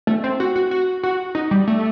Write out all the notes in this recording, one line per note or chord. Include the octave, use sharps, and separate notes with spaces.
A3
C4
F#4
F#4
F#4
F#4
D#4
G3
A3